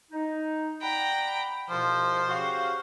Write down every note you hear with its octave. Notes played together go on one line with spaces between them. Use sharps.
D#4
D5 F#5 G5 A#5 B5
C2 B2 F3 C5
C#3 F#4 G4 F5